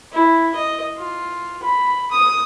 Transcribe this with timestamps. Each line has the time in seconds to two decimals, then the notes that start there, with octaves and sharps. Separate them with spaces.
0.13 E4
0.55 D#5
0.97 F4
1.63 B5
2.11 D#6